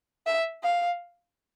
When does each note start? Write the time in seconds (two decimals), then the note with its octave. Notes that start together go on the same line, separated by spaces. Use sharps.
0.26 E5
0.63 F5